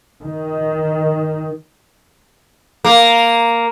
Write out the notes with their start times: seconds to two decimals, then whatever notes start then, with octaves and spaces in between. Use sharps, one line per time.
0.20 D#3
2.85 A#3